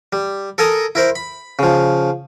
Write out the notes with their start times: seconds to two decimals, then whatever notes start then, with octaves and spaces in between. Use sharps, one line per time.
0.13 G3
0.58 A4 A#4 G#5 A#5 D#6
0.95 E4 A#4 C5
1.15 B5
1.59 C#3 F3